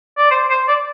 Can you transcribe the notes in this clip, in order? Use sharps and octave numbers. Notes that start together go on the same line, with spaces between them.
D5
C5
C5
D5